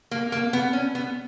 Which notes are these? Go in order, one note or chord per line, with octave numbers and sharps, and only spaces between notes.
A#3
A#3
B3
C#4
B3